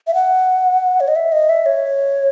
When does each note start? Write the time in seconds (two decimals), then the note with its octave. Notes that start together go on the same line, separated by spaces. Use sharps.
0.07 E5
0.14 F#5
1.00 C#5
1.08 D#5
1.16 E5
1.32 D#5
1.49 E5
1.66 C#5